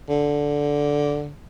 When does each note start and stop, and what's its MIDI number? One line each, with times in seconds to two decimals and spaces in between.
0.09 1.30 50